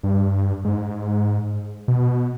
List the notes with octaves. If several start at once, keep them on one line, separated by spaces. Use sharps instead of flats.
G2
G#2
B2